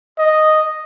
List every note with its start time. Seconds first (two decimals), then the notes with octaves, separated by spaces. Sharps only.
0.18 D#5